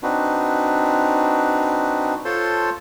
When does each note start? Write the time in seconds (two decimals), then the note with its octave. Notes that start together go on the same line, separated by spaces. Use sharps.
0.03 C4 D4 D#4 F#4 B4
2.25 F4 A4 C5 C#5 A5 C6